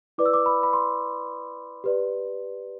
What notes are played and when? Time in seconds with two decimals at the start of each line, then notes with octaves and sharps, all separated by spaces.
0.18 E4 B4 D5 D6
0.26 E6
0.34 D6
0.46 B5
0.63 B5
0.73 C6
1.84 G4 B4 D5